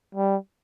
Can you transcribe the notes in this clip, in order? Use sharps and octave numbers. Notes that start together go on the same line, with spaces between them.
G3